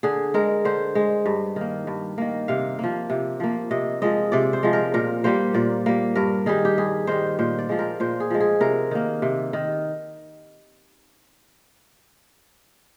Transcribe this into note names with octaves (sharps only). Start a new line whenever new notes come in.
D3 G#4
G#3 A#4
D3 C5
G#3
G2
D#3 A#3
G2
D#3 A#3
C3 F5
F3 A#3
C3
F3 A#3
C3 D#5
F3 G#3 D#5
C3 D5
C5
F3 G#3
A#4
A#2 A#4
G3 A#3 C5
A#2 D5
G3 A#3
G2 A#4
D#3 G3 G#4
G4
G2 G#4
D#3 G3 C5
A#2 C5
D5
F3 G#3
A#4
A#2 C5
G#4
F3 G#3
G#4
C3 A#4
D#3 A#3
C3
D#3